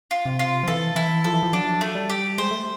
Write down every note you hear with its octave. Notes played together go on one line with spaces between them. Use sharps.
F4
C3
F4
F3
E3 A4
E3 E4
F3 A4
E3
F3
F#3 D4
A3
G3
G4
G#3 C5
A3